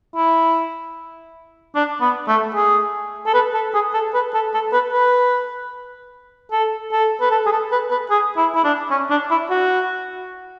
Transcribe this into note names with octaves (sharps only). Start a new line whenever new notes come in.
E4
D4
B3
A3
G#4
A4
B4
A4
G#4
A4
B4
A4
A4
B4
B4
A4
A4
B4
A4
G#4
A4
B4
B4
G#4
E4
E4
D4
C#4
D4
E4
F#4